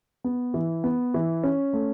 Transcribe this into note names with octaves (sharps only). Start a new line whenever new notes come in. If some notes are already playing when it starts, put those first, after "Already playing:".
B3
E3
B3
E3
C#4
A3